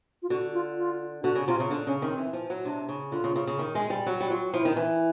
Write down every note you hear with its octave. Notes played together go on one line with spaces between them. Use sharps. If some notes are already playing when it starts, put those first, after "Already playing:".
F4
D3 F#4
F4
F4
D3 F#4
C#3
C3 F4
C#3
D3 D4
C#3 C#4
D#3 C4
E3
F3
F#3
C3 D4
C#3
D3 F4
C#3
C#3
C#3
D#3
G#3
G3
F#3 F#4
G3
F#3 F4
F3 E4
D#3
E3